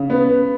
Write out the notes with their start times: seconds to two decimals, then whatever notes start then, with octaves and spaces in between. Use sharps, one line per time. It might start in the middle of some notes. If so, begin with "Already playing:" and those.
Already playing: C#3
0.10 B3